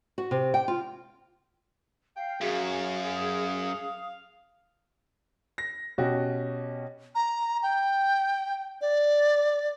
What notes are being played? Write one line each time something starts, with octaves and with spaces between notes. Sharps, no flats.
F#4
C3
G5
F4
F5 G5
F#2 F#4 G#4 F5
D#6
A#6
B2 C#4 F#4 G4
A#5
G5
D5